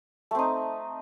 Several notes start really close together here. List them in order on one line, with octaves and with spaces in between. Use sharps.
A3 C4 D#4